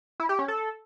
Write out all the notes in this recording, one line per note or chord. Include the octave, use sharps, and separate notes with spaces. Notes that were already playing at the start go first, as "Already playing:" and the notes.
E4
G4
C#4
A4